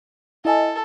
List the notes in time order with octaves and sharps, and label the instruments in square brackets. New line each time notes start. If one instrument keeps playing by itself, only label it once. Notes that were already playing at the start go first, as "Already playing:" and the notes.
[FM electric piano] E4 D#5 G#5 [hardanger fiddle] A4